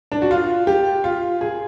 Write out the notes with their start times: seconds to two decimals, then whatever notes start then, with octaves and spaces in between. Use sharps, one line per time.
0.12 D4
0.22 F#4
0.31 F4
0.67 G4
1.04 F4
1.41 G#4